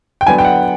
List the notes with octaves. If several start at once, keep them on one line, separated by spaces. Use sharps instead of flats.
G5
D3 F#3 B3 D4 G#5
G5
F#5